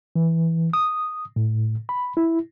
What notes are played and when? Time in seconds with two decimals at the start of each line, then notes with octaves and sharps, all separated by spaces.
0.16 E3
0.73 D#6
1.36 A2
1.89 B5
2.17 E4